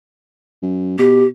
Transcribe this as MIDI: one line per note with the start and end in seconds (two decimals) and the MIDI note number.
0.63 0.95 42
0.99 1.26 47
0.99 1.25 67